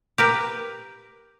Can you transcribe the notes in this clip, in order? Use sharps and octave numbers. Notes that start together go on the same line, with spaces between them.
G4 A#4 B4